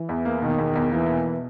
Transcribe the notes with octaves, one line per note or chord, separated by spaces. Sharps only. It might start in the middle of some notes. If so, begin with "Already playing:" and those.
Already playing: E3
E2
A#3
B2 D#3
E2
E2
E3 A#3
B2